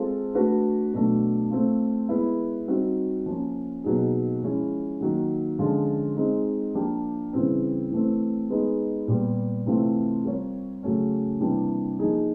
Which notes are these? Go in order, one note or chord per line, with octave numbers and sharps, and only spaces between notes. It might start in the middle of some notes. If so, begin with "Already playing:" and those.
Already playing: G#3 C4 F4 A4 C5
A3 D4 F#4 B4
B2 F#3 A3 D4
A3 C4 F4
G#3 B3 E4
G3 C4 D#4 F#4
F3 A#3 C#4
B2 F#3 A#3 D#4 G#4
F3 G#3 C#4 E4
D#3 F#3 A#3
D3 F3 G#3 C#4 F4
G#3 C4 D#4
F3 A#3 D4 G4
C#3 E3 G3 C4
E3 A3 C4
G#3 B3 D#4
A#2 G3 B3
C3 E3 A3 C4 F4
G3 C4 F4 A#4 C#5
C#3 F#3 A3 C#4
C3 E3 G3 A#3 D4
F3 A#3 D#4 G#4